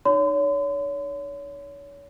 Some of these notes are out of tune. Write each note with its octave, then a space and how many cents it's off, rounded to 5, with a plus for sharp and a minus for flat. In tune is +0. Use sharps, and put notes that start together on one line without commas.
D#4 -25 C#5 +30 C6 -45